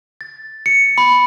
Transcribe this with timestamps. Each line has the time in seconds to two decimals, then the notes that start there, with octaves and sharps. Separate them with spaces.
0.21 A6
0.66 C#7
0.98 B5